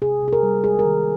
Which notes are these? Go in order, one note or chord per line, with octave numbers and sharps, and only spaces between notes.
C3 G#4
C3
G#4
A#4
G3
G#3 G#4
A#4
D#3